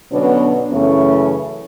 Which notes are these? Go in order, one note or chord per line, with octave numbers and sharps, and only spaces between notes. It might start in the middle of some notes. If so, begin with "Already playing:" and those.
B2 D3 F#3 B3 C#4 D4
F#2 C#3 E3 A3 C#4